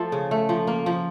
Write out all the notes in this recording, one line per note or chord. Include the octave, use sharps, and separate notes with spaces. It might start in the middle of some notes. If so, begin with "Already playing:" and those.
Already playing: F3 A3 A4
C#3
A3
F3
A#3
F3